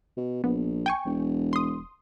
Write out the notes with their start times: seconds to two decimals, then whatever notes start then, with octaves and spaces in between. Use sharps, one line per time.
0.17 B2
0.44 A#1 B3
0.86 G5 G#5 C#6
1.05 E1
1.53 C6 D#6